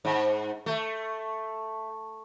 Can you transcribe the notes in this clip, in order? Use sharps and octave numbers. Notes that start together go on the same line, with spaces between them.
G#2
A3